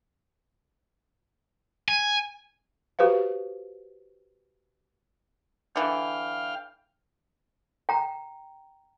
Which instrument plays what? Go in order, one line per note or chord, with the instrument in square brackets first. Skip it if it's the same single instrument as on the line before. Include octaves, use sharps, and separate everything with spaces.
[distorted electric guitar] G#5
[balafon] F#4 G4 B4 C5 F5
[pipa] D3 E3 [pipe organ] F5 G5 F6
[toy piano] G5 A#5